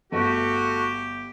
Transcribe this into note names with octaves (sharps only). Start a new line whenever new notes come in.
G1 A3 F#4 G4